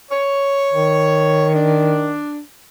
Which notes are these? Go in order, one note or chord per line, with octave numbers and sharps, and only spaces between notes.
C#5
D#3
D4